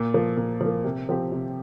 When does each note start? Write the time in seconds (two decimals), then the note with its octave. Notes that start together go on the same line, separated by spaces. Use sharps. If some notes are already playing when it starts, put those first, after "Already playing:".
Already playing: A#2
0.14 F3 A#3
0.37 A#2
0.61 F3
0.66 A#3
0.84 C3
1.09 F3 C4 G4
1.32 C3